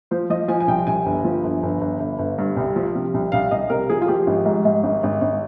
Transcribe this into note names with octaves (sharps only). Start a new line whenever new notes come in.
F3 C5
F3 D#5
F3 G#5
G#5
C2 G5
C2 G#5
G1
F3
G1
G1
G1
G1
G1
G2
C2
F3
C3
C2
C2 F5
C2 D#5
C3 A#4
F3 G#4
F4
F3 G4
G#1
G#2
G#2
G#1
G#1
G#1